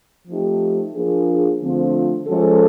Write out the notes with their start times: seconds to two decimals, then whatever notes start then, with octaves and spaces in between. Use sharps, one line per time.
0.27 F3 A3 C4 D#4 G4
0.94 F3 A#3 D4 F4 G#4
1.60 D3 F3 A3 C4 F4
2.27 F3 G#3 C#4 F#4 A4